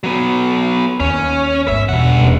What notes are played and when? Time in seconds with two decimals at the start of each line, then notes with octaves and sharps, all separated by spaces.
0.04 F#3 B3
1.00 D#2 C#4
1.68 G#1 B3 E5
1.89 E2 G2 B2 F#5
2.20 D#1